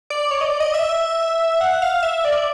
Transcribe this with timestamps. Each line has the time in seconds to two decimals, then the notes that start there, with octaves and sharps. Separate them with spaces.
0.10 D5
0.31 C#5
0.41 D#5
0.46 D5
0.60 D#5
0.74 E5
1.61 F#5
1.82 F5
2.03 E5
2.25 D5